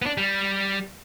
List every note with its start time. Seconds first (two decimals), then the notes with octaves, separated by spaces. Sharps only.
0.02 B3 D4
0.18 G3